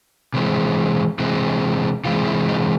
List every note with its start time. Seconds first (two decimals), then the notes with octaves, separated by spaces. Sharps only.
0.34 C3 E3 G#3 C4
1.19 C3 E3 G#3 C4
2.05 C3 E3 G#3 C4 F4
2.26 E4
2.48 D#4